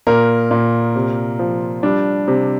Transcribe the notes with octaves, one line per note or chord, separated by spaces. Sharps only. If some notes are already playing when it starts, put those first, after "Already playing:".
A#2 A#4
A#2
C3
F3
G3 D4
C3